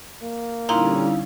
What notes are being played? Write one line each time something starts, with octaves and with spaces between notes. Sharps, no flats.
A#3
A#2 D3 G3 C#4 D#4 E4 F5